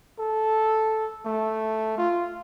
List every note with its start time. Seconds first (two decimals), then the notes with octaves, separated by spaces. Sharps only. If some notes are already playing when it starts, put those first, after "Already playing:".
0.19 A4
1.25 A3
1.98 F4